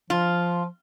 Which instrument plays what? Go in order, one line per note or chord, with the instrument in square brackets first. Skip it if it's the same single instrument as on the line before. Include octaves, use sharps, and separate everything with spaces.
[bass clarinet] F3 [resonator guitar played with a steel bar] F4